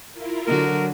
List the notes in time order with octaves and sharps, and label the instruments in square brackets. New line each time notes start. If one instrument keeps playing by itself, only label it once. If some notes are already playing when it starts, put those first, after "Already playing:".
[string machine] E4 F4 A#4
[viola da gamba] D3 F#4 [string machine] F#3 [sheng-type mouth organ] A#4